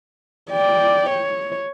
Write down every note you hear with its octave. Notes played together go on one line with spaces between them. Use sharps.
D5 G5
C#5